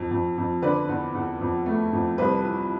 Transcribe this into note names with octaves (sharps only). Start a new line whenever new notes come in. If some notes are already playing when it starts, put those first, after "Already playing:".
Already playing: F2
F2
F2
D3 B4 D5
E2
E2
F2
A3
F2
C2 B4
E3